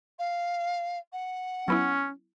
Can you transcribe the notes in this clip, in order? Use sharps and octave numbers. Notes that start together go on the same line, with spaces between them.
F5
F#5
F#3 B3 C#4 E4